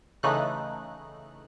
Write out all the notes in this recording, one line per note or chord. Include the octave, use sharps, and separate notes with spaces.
C#3 E3 A3 D#4 F#6